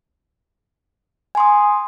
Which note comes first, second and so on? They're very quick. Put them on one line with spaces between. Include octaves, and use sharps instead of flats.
G#5 C6 D#6